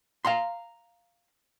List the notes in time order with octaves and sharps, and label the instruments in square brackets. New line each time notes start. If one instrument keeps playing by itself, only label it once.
[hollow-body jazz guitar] F5 A#5 C6